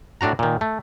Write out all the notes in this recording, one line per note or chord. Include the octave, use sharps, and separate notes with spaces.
A2 D4 F#4 A#5
A#2 D#3
A3